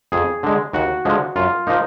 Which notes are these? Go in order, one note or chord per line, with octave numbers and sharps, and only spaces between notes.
F2 G#4
D3 G#3
D#2 F#4
D3 F3 G#3
F#2 F4
F3 A#3 D#4